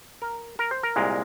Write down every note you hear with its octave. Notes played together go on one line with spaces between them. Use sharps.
A#4
A#4
C5
A#4
C2 A#2 G#3